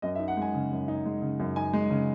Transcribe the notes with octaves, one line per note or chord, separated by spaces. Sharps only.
F#2 D#5
E5
D#4
F#5
G#3 G#5
C#3
F#2
D#4
G#3
C#3
F#2
D#4 G#5
G#3
C#3